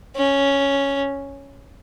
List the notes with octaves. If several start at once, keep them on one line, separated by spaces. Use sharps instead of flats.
C#4